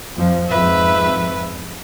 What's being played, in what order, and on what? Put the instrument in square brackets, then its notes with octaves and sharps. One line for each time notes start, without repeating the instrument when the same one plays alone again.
[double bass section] F2 F3
[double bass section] F2 G#2 [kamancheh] B4 E5